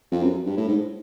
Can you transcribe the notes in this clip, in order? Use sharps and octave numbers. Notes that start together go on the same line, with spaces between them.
F2
F#2
G2
A2
G#2